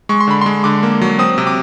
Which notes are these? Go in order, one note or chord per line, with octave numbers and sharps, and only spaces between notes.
G#3 C#6
C6
D3 B5
G#3 C6
D3 D6
A#3
F#3
C4 D#6
C3
D6